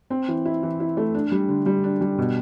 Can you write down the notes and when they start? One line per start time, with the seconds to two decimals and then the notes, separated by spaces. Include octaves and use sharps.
0.10 C4
0.28 E3
0.45 E4
0.63 E3
0.80 E4
0.97 A3
1.14 D4
1.32 G3
1.49 D3
1.66 G3
1.84 D4
2.01 G3
2.18 B2